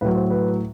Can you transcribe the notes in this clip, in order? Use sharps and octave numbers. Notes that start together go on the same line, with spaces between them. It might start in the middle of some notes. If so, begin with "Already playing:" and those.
A2 F#3 B4
C5
B4